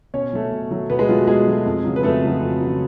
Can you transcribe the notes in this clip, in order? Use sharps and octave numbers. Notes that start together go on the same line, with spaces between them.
B2 C#4 C#5
F#3 A3
B2
F#3 A3
B2 B3 B4
G#3 G#4
F#3 A3 F4
F#4
B2 G#3 G#4
F#3 A3
F2
C#3 F#3
B4
F2 A3 A4
C#3 F#3
F2
C#3 F#3